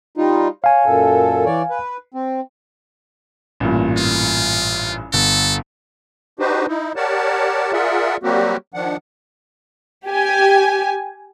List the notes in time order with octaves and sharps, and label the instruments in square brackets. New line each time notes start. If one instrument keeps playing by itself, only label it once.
[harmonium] G3 D#4 F4
[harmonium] C#5 [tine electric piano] F5 G#5
[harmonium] F#2 A#2 A4
E3 C#5 D5
B4
C4
[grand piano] A1 G2 A#2
[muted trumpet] F4
[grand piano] G1 [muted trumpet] A4
[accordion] D4 D#4 F#4 G4 B4 C5
D#4 E4
G4 A#4 C#5 D5 F#5 A5
F4 G#4 A#4 D5 E5 F#5
F#3 G3 A#3 C4 F#4 G4
D#3 F3 D4 F#5
[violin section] G4 G#5